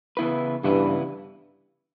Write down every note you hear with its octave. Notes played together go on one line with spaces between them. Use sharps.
C#3 E3 B3 E4 B4
G2 C#3 E3 B3 E4 B4